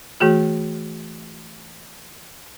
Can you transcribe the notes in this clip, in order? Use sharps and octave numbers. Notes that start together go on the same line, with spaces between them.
E3 A3 F#4 G#4